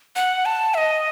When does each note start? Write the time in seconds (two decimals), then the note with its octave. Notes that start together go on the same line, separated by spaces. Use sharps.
0.16 F#5
0.45 A5
0.74 E5
0.78 D#5